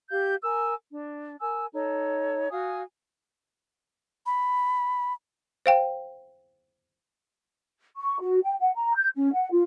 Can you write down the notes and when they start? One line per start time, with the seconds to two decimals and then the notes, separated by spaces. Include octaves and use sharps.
0.10 G4 F5 G6
0.42 A#4 G#5 E6
0.92 D4
1.40 A#4 G#5 E6
1.73 D#4 A4 C#5
2.50 F#4 F5 G#5 D#6
4.26 B5
5.66 C5 F5 G5
7.97 C#6
8.20 F#4
8.44 G5
8.60 F#5
8.75 A#5
8.96 G6
9.15 C#4
9.33 F#5
9.51 F4